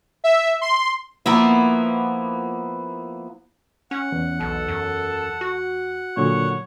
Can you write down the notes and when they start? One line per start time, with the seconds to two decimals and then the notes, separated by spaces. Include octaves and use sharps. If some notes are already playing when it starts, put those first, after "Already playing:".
0.24 E5
0.61 C6
1.26 F3 A#3 B3 E4
3.91 C#4 F#5
4.12 E2
4.40 B1 A4
4.68 F#2
5.41 F#4
6.17 A#2 D3 F#3 C#5